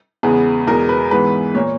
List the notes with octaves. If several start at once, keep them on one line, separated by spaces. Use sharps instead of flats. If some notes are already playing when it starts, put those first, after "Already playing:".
E2 C#3 G#3 B3 G#4
E2 B2 G#3 A#4
B4
G#2 E3 G#3 B3 B4
A#2 A#3 C#5